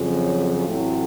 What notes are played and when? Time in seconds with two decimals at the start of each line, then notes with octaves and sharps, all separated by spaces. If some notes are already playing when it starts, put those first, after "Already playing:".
Already playing: F2 C#3 F#3
0.66 A1 A2 F#3 A3 C4